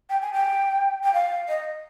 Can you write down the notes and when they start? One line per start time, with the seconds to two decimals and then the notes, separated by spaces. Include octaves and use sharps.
0.10 G5
0.22 G#5
0.33 G5
1.03 G5
1.14 F5
1.48 D#5